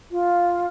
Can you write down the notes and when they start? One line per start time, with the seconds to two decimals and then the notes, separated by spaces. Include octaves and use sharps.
0.11 F4